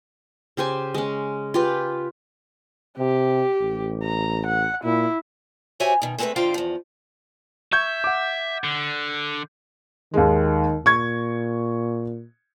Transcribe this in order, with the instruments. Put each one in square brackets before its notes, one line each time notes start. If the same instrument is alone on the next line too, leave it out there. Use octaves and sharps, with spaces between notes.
[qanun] C#3 G4 C5 G#5
G#3 C#4
F4 G4 B4
[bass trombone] C3 [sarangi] G4
[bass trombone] A1
[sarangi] A#5
F#5
[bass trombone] A#2 [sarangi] E4
[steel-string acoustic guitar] F#4 G4 C5 C#5 E5 G#5
B2 D#3
G#3 A3 C4 A#4 B4 E5
G#2 D3 F4 C5 F5 G5
E2 F3
[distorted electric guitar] E5 [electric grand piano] C#6 G6 G#6
[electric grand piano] F#5 D6
[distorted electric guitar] D3
[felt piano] D#2 G#3 [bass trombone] D#3
[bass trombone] A#2 [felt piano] C#6 G#6